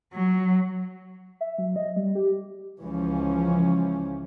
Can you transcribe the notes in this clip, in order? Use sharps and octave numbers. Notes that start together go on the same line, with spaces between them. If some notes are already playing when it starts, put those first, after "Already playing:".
F#3
E5
F#3
D#5
G3
G4
C#2 E3 F3 C#4